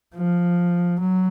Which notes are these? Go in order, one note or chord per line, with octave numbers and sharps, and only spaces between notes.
F3
F#3